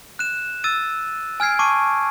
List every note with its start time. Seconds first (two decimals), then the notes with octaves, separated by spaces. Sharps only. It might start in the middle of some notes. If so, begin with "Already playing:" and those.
0.19 F#6 E7
0.64 E6 A6 D#7
1.40 G#5 F6 G#6 C7 D7
1.59 A5 C#6 D6 C7 D#7